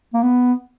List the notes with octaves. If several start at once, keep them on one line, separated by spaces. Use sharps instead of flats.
A#3
B3